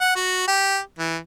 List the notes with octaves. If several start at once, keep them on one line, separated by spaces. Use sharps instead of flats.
F#5
F#4
G4
E3